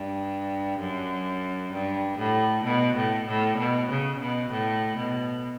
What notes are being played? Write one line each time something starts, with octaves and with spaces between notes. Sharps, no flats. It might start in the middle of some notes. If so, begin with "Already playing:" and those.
Already playing: G2
F#2
G2
A2
B2
A2
A2
B2
C#3
B2
A2
B2